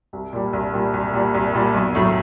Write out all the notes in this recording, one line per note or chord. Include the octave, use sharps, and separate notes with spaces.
C2
A#2 G3
C2
A#2 G3
C2
A#2 G3
C2
A#2 G3
B1
A2 F#3 A3